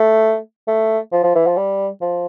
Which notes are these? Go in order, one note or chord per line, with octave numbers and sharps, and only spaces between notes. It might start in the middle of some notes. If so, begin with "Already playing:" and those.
Already playing: A3
A3
F3
F3
E3
F3
G3
F3